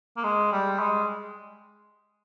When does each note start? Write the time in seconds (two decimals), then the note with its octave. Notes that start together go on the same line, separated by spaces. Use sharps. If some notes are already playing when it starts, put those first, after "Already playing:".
0.17 A#3
0.24 G#3
0.52 G3
0.80 G#3